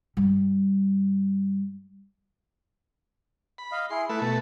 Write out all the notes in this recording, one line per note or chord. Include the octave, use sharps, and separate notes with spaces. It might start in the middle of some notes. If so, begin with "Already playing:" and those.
G2 G3
B5
D#5 F5
E4 G#4 C6
A3 E4 B4
B2 A3 A5